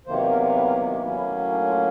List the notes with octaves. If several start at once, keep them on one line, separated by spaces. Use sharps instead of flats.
E2 C3 D#3 F#3 A#3 C5
A#4
B4
A#4
G4
A2 F#3 A#3 C#4 E4
D4
F4